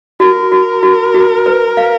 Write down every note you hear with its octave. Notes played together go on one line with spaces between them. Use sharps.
F#4 A#4
F#4
F#4
F#4
B4
F5